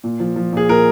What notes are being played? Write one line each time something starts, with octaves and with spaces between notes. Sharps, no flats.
A#2
F3
F3
A#2 G#4
A#2 A#4